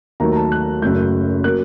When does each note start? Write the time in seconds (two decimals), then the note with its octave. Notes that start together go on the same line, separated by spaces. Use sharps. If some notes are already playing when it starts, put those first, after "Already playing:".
0.20 D#2 D#3 F#3 A3 A#5
0.32 A#5
0.36 A5
0.52 F#6
0.82 F#1 F#2 F#3 A3 G6
1.44 F#3 A#3 F#6